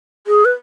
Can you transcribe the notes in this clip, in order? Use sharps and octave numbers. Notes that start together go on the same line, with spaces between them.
G#4
B4